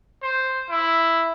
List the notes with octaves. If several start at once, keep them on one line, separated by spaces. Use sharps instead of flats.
C5
E4